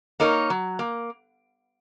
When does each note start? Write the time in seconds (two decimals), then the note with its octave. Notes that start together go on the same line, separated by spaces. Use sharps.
0.20 A#3 D#4 A#4 C#5
0.50 F#3
0.79 A#3